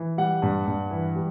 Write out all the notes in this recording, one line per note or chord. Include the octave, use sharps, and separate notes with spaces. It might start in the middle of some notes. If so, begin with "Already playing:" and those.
Already playing: E3
G3 F#5
G2
G2
E3
G3